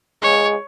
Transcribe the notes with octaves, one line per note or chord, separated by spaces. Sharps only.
G#3 C#5